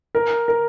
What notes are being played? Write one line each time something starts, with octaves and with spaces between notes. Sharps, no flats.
A#4
A#4